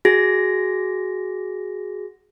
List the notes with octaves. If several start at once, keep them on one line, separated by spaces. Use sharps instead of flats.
F#4 G#4 A#6